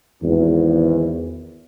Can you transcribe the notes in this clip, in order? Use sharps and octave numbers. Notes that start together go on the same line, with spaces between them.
G#1 E2